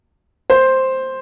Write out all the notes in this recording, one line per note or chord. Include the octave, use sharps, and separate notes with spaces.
C5